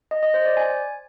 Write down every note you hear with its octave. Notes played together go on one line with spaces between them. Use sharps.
D#5
D#5
C5
D5
G#5